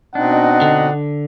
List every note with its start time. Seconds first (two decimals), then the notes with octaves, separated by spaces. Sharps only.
0.15 B2 C4 D4 D#4 D#5 F#5
0.62 D3